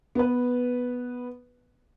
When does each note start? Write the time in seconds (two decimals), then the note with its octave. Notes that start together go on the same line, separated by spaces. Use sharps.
0.15 B3 B4